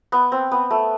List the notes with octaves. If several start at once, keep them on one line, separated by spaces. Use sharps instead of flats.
B3
C4
B3
A3